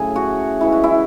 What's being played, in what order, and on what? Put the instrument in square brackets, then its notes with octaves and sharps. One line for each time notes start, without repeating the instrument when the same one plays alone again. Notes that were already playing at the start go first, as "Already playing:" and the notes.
Already playing: [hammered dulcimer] A2 C#3 F#3 A3 G#4
F#4
C#3 E3 G#3 E4
F#4
E4